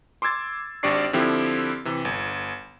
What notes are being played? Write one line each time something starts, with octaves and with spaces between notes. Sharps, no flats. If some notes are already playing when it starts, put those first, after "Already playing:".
C6 D6 E6 G#6 A6
G#1 D4 G4 D5 C#6 C7
D3 F3 C4 E4 G4
C3 E3
G1